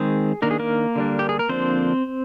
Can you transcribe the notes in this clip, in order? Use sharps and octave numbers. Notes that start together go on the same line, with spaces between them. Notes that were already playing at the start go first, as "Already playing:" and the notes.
Already playing: D#3 G#3 C4 G#4
D#3 A#3 D4 A#4
G#4
A#3 A#4
D3 G3 D4
G4
G#4
A#4
D3 F3 A#3 C4 D4 C5